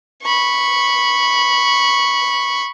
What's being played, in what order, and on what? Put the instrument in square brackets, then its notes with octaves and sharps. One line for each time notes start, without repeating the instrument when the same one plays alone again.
[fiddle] B5 C#6